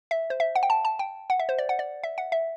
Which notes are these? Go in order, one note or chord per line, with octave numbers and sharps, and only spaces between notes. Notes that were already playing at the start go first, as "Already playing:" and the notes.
E5
C5
E5
F#5
G5
A5
A5
G5
F#5
E5
C5
D5
F#5
D5
E5
F#5
E5